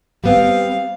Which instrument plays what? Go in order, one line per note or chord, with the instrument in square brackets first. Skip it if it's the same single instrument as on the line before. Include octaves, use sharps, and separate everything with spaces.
[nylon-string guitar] G3 B3 C4 [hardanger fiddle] F5